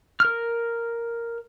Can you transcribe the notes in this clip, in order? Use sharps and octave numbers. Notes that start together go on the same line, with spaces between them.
A#4 F6